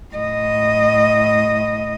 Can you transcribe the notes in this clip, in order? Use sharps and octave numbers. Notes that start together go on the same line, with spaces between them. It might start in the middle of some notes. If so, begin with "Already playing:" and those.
A2 D#5